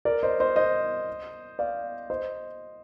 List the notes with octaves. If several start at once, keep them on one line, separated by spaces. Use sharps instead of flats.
A#4 D5
C5 D#5
C5 D#5
C5 D#5
D5 F5
C5 D#5